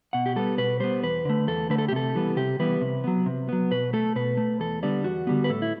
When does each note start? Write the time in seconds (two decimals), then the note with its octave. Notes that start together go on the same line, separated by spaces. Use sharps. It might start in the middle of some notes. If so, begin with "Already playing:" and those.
0.13 B2 F#5
0.26 G4
0.36 G3 B3 A4
0.58 B2 B4
0.80 G3 B3 C5
1.03 E2 B4
1.25 D3 A3
1.47 E2 A4
1.70 D3 A3 B4
1.78 A4
1.88 G4
1.92 C3 A4
2.15 E3 G3 B3
2.37 C3 G4
2.59 E3 G3 B3 B4
2.81 C3
3.04 F#3 B3
3.26 C3
3.49 F#3 B3
3.71 B2 B4
3.93 A3 A4
4.16 B2 B4
4.37 A3
4.60 E2 A4
4.83 D3 G3 B3 D5
5.04 E2 F#4
5.27 D3 G3 B3
5.44 B4
5.50 A2 A4
5.62 E4